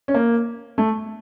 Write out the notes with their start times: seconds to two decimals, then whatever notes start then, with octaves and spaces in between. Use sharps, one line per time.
0.08 C#4
0.14 A#3
0.78 A3